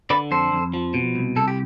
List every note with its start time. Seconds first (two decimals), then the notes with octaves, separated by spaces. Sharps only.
0.10 D3 B4 D5
0.31 F2 A4 C5
0.52 F2
0.74 F3
0.94 B2
1.15 C2
1.36 C2 A4
1.48 G4